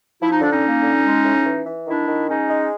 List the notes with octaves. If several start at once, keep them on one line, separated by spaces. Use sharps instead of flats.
F3 E4
D#4
D3 D4
C#4 D#4
A#3
D3
G#3
A2
E3
E3
D#3 D4 E4
D#3
G#3 C#4 D#4
G#3